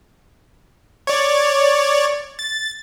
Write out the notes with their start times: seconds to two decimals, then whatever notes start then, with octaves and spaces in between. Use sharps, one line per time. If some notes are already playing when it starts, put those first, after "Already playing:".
1.07 C#5 D5
2.39 A6